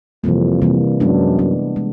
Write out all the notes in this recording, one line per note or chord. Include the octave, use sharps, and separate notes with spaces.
F2 C3 E3 G3 A#3
C3 E3 G3 A#3
F#2 G#3 B3 D4
G#3 B3 D4
G#3